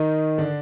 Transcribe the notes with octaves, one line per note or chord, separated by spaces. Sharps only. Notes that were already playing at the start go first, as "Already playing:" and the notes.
Already playing: D#3 D#4
D3 D4